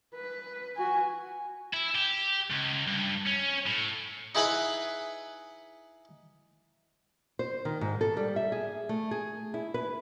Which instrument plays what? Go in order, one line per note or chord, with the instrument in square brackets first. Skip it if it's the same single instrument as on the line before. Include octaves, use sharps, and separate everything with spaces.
[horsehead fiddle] B4
F#4 G#5
[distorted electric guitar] E4
G4
C#2
G2
C#4
A2
[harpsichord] D#4 E4 G#4 B4 F#5 B5
[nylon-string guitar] C5
D#3
G#2
A4
G3
E5
G#4
A3
G#4
E4
B4